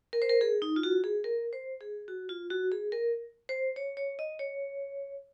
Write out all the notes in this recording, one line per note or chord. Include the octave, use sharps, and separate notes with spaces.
A#4
C5
A#4
G#4
D#4
F4
F#4
G#4
A#4
C5
G#4
F#4
F4
F#4
G#4
A#4
C5
C#5
C#5
D#5
C#5